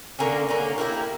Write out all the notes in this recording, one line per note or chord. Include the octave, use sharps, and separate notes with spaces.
D3 A#3 C#4
D3 A#3 C#4
A#3 E4 G4 A#4